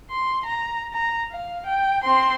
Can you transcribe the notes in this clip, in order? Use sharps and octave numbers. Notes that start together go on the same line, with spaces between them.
C6
A#5
A#5
F5
G5
C4 C6